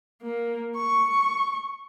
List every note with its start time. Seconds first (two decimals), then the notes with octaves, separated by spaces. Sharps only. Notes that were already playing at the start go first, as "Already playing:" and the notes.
0.23 A#3
0.77 C#6